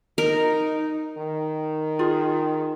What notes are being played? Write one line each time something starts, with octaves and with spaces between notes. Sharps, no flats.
D#4 A#4
D#3
F4 G#4